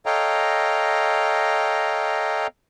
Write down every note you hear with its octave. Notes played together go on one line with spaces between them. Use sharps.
A4 C#5 D#5 F5 G5 A#5